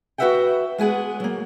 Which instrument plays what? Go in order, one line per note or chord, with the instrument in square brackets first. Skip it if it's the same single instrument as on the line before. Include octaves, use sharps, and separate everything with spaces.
[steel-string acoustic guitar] F#4 A#4 B4 E5 F#5 G5
G#3 B3 G#4 F#5
F#3 A#3